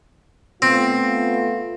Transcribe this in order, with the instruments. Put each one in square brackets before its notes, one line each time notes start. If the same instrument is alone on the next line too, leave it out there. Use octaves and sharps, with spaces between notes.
[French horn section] A3 B3 F4 [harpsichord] C4